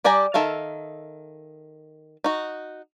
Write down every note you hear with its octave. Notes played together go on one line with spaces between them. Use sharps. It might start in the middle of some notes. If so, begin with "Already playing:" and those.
G3 G4 D5 G#5 A#5
D#3 A4 E5 F5
D#4 F#4